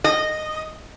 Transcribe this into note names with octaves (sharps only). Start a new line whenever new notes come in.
D#5